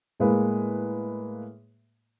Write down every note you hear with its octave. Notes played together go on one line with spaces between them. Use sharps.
A2 G#3 A#3 B4